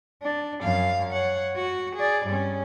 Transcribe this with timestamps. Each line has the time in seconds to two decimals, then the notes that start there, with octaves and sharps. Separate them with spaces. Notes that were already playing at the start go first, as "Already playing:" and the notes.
0.22 D4
0.62 F#2 F5
1.12 C#5 F#5
1.56 F#4
1.96 G#4 D5
2.26 G2 C#4